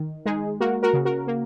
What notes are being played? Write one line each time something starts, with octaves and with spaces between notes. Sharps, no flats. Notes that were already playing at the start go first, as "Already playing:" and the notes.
Already playing: D#3
G#3 D#4 G#4
A#3 F#4 A#4
F#4 A#4
C#3
F#4 A#4
A#3